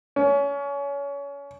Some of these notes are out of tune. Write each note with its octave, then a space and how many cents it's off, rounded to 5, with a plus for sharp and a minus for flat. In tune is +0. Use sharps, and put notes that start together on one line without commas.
C#4 +25